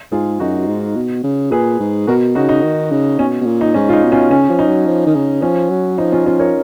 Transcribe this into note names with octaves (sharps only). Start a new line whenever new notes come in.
G#2 F4 G#4
F#2 D#4 F#4
G#2
B2
C#3
A#2 G#4 B4
G#2
B2 F#4 A#4
C#3 D#4 F#4
D#4
D#3
C#3
B2 C#4
B2
A#2
D#4
G#2 C#4
F4
D#4
B2
C#4 F4
C#3 C#4
F3
D#4
F#3
F3
D#3
C#3
F3 C#4
F#3
F3 D#4
C#4 F4
F3 C#4 F4
A#4 C#5